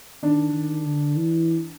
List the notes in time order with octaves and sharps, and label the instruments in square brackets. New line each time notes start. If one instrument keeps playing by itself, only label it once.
[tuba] D#3 [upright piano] D4
[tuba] D#3
D3
E3